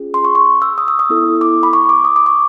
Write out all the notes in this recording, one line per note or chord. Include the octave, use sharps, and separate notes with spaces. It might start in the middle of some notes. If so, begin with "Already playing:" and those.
Already playing: C#4 F4 G#4
C6
C#6
C#6
E6
D#6
E6
D#6
B3 E4 A4
D6
B5
C#6
D6
D#6
D6
C#6